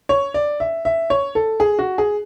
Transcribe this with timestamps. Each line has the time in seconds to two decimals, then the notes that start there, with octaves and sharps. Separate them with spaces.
0.09 C#5
0.34 D5
0.60 E5
0.85 E5
1.10 C#5
1.35 A4
1.60 G#4
1.79 F#4
1.98 G#4